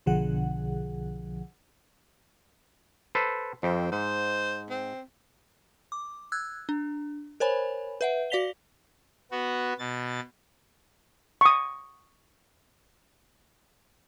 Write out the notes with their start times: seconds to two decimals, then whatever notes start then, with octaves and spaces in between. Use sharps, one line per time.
0.06 B1 B2 D3 F3 G#4 F#5
3.15 A4 B4 C5
3.63 F2 C4
3.92 G#2 C5
4.70 C4
5.92 D6
6.32 E6 F#6 G#6
6.69 D4
7.40 A#4 C5 C#5 G#5 B5
8.01 B4 E5 F#5
8.30 F#4 D5 F5 B6 F7 G7
9.31 B3 F#4
9.79 B2 A6
11.41 C#6 D#6